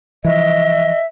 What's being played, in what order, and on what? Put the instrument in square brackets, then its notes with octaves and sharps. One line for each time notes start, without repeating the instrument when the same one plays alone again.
[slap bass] E3 F3 [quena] D#5 [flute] E5